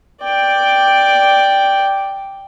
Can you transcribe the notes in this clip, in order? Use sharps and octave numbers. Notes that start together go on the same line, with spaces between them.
D5 G5